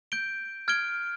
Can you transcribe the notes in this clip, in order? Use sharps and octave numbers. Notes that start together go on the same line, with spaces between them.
G6 D7 G7
F6 G#6 D7 G7